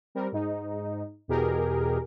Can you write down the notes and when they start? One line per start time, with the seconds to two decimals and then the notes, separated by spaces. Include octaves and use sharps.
0.15 G3 C4 A#4
0.32 G#2 D#4
1.28 E2 B2 G4 G#4 A#4